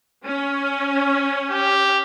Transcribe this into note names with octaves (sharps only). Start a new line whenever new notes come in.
C#4
G4